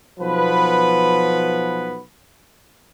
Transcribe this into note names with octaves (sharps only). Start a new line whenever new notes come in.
B1 F3 B3 B4